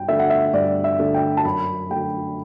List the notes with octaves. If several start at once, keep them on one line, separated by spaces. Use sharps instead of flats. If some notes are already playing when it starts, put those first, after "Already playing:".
Already playing: G2 G5
D3 A3 D4 E5
F#5
E5
G2 D5
E5
D3 A3 D4
G5
A5
F#2 B5
D3 A3 G5